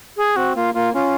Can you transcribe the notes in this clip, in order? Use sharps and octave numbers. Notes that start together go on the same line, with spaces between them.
G#4
C4 F#4
A#3 F4
A#3 F4
C#4 F4